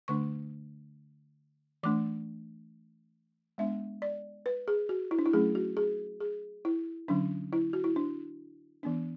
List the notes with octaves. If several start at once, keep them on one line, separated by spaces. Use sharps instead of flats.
D3 A3 D4 C#6
E3 A3 D4 D6
G#3 B3 D4 E5
D5
B4
G#4
F#4
E4
D4
E4
F#3 A3 C#4 G#4
F#4
G#4
G#4
E4
D3 F#3 C#4 D4
E4
F#4
E4
D4
E3 B3 D4